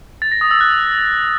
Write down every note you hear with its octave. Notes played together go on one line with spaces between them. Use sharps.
A6
A#6
D#6
E6
F#6